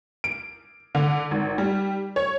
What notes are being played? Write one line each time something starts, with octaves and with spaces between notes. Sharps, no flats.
D7
D3
G#1
G3
C#5